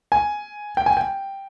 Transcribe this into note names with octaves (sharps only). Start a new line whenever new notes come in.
G#5
G5
G#5
G5